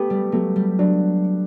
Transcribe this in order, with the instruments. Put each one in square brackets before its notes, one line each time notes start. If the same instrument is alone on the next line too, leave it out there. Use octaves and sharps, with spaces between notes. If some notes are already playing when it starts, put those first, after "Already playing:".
Already playing: [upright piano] A3 G4 [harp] B3
[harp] G3
[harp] F#3 [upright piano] A3
[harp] G3
[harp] F#3 [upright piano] D4